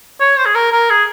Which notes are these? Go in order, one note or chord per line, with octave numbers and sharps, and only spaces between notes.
C#5
C5
G#4
A#4
A#4
G#4